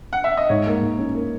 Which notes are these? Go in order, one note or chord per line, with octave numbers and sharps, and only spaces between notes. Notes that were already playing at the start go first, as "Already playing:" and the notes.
F#5
E5
D#5
G#2 C#5
A#3
G#2
C#4
A#3